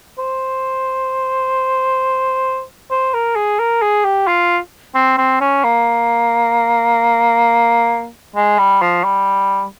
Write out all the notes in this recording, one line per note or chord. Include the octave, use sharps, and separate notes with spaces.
C5
C5
A#4
G#4
A#4
G#4
G4
F4
C4
C4
C#4
A#3
G#3
G3
F3
G3